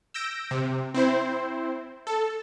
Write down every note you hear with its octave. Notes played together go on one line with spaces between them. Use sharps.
E6 G6 A#6 D7
C3
C4 E4 C5
A4